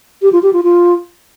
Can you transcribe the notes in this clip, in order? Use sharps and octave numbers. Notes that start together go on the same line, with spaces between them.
G4
F4
G4
F4
F4